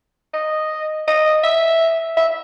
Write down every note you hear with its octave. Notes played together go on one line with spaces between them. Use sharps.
D#5
D#5
E5
E5